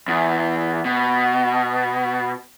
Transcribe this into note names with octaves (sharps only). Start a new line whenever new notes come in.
E2
B2